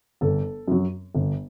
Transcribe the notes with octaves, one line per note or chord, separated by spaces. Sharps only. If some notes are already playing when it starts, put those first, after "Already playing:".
G1 A4
F#2 F#3
G1